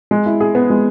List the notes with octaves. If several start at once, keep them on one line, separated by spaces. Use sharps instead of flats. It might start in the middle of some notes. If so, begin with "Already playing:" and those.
G#3
E4
G#4
B3
G#3